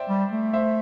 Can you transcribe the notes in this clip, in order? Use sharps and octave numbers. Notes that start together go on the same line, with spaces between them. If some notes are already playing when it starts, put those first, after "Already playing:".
Already playing: C5 D5 E5 G5
G3
A3
C5 E5